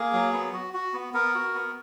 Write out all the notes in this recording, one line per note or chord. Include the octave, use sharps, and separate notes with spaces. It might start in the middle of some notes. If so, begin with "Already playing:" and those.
Already playing: A#3 G#4
F#3
B3
F#4
F#4
B3
B3 A#4
F#4
B3